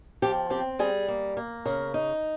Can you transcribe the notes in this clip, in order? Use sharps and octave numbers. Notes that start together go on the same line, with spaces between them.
F3 G4
C4 G4
G3 G#4
A#3
A#3
C#3 A#4
D#4